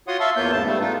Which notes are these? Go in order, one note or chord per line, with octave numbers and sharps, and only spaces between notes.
F4 F#4 C#5 F#5 C6 D#6
E5 F5 A5 C6 C#6 E6
E2 A#3 B3 F4 C#5 G6
G#2 C#3 A5
G3 A3 B3
B3 D4 D#4 F4